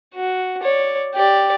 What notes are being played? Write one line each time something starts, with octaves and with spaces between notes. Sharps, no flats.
F#4
C#5 D5
G4 D5